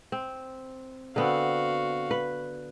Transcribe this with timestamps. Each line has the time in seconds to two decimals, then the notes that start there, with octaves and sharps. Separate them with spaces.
0.12 C4
1.16 D3 B3 C4 F#4 F5
2.11 B4